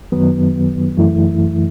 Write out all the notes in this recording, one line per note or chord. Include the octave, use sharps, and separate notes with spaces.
F#2 D#3 F#3 B3
F#2 E3 A3 E4